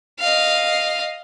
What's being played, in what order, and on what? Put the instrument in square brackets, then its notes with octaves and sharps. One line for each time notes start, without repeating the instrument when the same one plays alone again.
[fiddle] D#5 F5